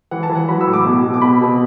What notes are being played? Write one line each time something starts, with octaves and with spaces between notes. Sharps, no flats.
E3 F#5
A5
E3
F#5
F#3 B5
E6
A2
D6
B2
B2
D6
B2 B5
B2